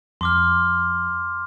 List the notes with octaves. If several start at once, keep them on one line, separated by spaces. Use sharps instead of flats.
F2 C6 D6 F6